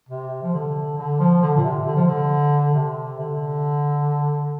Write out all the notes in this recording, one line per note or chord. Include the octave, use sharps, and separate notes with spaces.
C3
F3
D3
D3
F3
D3
A#2
C3
D3
F3
D3
C3
D3